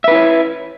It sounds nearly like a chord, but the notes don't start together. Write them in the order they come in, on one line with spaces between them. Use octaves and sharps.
E5 B4 E4 C#5